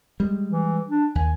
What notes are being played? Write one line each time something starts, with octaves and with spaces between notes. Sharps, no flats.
G3 G#3
E3
D4
D#2 G#5